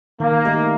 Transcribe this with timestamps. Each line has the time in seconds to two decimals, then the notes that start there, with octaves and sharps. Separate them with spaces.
0.20 D#3 A#3
0.45 A3 D#4 G4